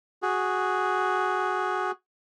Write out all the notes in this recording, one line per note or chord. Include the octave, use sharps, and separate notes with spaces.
F#4 G#4